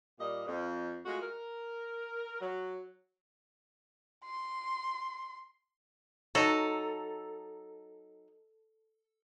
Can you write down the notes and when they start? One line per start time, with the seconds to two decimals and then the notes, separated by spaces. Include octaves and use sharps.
0.19 A#2 G3 A#3 D#5
0.46 F2
1.05 G#3 A3 F4 F#4
1.21 A#4
2.40 F#3
4.25 C6
6.35 F#3 D#4 A4